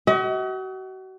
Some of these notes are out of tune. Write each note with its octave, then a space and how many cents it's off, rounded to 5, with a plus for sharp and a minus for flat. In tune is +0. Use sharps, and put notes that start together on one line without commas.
F#4 +35 D#5 +45